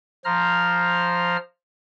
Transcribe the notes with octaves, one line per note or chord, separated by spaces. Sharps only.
F3 C5 A#5 F6